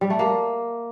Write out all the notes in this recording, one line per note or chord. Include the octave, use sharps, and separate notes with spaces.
G3
A3
A#3